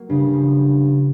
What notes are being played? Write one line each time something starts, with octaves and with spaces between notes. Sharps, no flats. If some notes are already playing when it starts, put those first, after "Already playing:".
Already playing: F#3 A#3
G2 C#3
F3